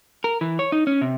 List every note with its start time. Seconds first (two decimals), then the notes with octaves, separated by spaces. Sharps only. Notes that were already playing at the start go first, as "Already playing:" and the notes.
0.24 A#4
0.41 E3
0.59 C#5
0.72 D#4
0.87 C#4
1.01 C3